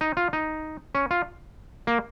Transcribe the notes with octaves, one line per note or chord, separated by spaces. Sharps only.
D#4
F4
D#4
C#4
F4
A#3